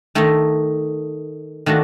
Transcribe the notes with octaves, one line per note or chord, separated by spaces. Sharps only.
D#3 A3 D#4
D#3 A3 D4 F#4